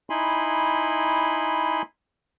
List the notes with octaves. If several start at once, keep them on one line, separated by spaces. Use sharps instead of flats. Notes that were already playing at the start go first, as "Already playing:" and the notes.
D#4 E4 G#5 B5 C6